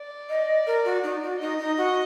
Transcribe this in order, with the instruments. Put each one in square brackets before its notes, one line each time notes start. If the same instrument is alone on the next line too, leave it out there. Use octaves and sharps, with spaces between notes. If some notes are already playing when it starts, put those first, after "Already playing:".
Already playing: [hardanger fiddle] D5
[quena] D#5
A#4
F#4
D#4
F#4
[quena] D#4 [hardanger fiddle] D#5
[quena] D#4
F#4